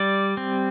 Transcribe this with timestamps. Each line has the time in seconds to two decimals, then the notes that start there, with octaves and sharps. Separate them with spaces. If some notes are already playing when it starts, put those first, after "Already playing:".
Already playing: G3 D5
0.37 C4